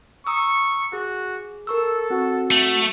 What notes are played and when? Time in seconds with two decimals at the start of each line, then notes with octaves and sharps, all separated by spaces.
0.27 A#5 C#6 D#6 E6
0.93 F#4 G#4
1.67 A4 A#4 C#6 E6
2.10 C4 F#4
2.51 A3